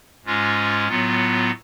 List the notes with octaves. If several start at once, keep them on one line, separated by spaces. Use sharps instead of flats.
G#2 G#3 C#4 F4
A2 F#3 B3 F4